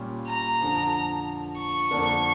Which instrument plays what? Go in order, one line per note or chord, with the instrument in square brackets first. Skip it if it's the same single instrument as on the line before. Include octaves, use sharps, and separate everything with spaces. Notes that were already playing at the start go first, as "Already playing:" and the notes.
Already playing: [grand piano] A#2 G3 C#4 F4
[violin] A#5
[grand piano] F2 D3 F3
[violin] C#6
[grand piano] F2 D3 F3 A#3 D4